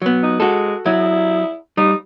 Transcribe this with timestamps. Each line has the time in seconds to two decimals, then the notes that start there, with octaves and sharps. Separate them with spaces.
0.02 F#3 B3
0.23 D#4
0.40 G#3 F#4 A4
0.86 F#3 E4
1.77 G3 D#4